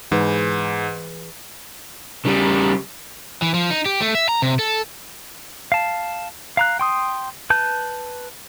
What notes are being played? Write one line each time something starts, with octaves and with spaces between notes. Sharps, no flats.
G#2 E3 G#4 B4
C#3 G3
E3
F3
D#4
G4
A3
E5
A#5
C3
A4
F5 A5
F5 A#5 F#6
G5 C6 D#6
B4 A5 G6